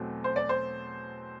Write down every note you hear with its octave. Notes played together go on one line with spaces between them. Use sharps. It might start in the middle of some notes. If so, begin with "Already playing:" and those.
Already playing: E2 B2 F#3 A3 C4
C5
D5
C5